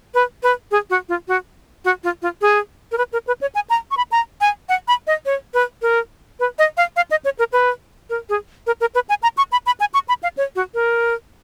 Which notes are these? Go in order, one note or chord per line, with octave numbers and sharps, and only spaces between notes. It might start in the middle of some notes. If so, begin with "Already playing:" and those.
B4
B4
G#4
F#4
F4
F#4
F#4
F4
F4
G#4
A#4
B4
A#4
B4
C#5
G#5
A#5
C#6
B5
A#5
G#5
F#5
B5
D#5
C#5
B4
A#4
B4
D#5
F5
F5
D#5
C#5
A#4
B4
A#4
G#4
A#4
A#4
B4
G#5
A#5
C#6
B5
B5
G#5
C#6
B5
F5
C#5
F#4
A#4